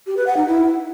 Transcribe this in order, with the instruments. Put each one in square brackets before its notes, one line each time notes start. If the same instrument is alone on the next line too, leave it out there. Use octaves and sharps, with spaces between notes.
[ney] G4
B4
F#5
D#4
E4